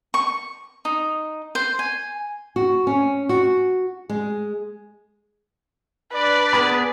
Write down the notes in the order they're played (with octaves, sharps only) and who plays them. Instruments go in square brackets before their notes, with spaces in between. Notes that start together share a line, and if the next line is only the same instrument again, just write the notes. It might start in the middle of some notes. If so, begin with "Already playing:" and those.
[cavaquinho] C#6
D#4
C5
G#5
[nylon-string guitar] F#4
C#4
F#4
G#3
[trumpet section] D4 D5 [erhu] B4
[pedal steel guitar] B3 G#4 B5